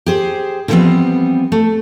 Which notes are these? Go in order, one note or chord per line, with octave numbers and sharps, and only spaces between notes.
G4 G#4 C5
D3 E3 F3 G3 B3 C4
A3